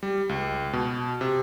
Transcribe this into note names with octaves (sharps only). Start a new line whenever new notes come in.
G3
C#2
B2
C3